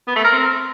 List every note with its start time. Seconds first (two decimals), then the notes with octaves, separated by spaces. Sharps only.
0.08 B3
0.16 A3
0.24 A#4
0.32 C4